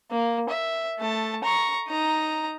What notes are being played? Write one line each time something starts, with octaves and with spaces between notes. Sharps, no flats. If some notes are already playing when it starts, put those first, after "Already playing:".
A#3
E5
A3 A5
A#5 C#6
D#4 A#5